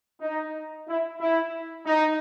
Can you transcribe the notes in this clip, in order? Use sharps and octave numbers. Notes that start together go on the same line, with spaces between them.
D#4
E4
E4
D#4